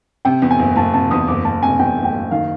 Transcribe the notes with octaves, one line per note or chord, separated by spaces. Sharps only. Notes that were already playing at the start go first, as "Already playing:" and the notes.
C3 G5
E2
G#5
F#1
F#1 A5
C3 A5
E2 D#6
F#1 D6
F#1 A5
C3 G#5
E2 G5
F#1
G5
F#1
D#3 F5